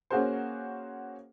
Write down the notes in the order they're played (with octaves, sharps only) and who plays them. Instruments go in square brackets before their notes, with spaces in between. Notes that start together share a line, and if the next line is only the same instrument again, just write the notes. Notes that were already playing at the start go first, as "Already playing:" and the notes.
[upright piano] A#3 C#4 F#4 G#4 A#4 C5